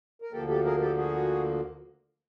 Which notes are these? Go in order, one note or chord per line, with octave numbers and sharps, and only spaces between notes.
A#4
D2 D3 F3 A#3 G4 A4
G4 A4
G#4 A#4
G4 A4
F#4 G#4